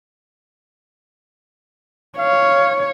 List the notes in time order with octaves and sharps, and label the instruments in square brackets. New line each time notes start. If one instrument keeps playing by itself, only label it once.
[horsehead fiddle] C#5 [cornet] F5